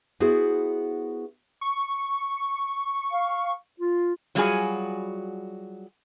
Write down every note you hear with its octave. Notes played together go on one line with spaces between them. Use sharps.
B3 E4 F#4 G#4 C5
C#6
F5
F4
F#3 G3 F4 F#4 G#4 G#5